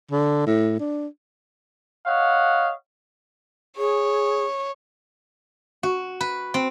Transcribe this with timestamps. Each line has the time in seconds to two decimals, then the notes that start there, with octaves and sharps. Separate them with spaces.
0.11 D3
0.47 A2
0.79 D4
2.06 C#5 D#5 F5 F#5
3.77 G#4 C#5
5.83 F#4
6.21 B4
6.54 C4